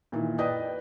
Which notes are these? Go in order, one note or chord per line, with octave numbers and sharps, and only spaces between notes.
A#2 D#3 E3
B4 D5 D#5 G5 D#6